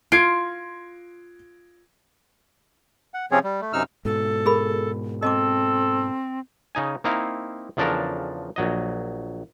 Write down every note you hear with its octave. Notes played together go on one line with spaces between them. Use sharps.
F4 G#6 C7 D7
F#5
C3 F3 C4 C#4 G#4 C#5
G3
A3
F#2 C3 D#4 E6 F6
G#2 B2 A4
G#4 A#4 B5
C4 A4 D#5 A5 D6
C#3 D#4 G#5
A#3 C4 D#4 E4 F5
E2 C#3 F3 D4 A4 A#4
A#1 F#3 D#5